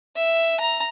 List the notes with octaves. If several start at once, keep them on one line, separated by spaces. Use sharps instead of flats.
E5
A#5